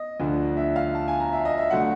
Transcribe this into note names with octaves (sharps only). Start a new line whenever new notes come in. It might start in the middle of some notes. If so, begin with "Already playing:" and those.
Already playing: D#5
D2 D3 F3
E5
F5
A5
G#5
A#5
E5
D#5
E5
D3 F#3 A3 F#5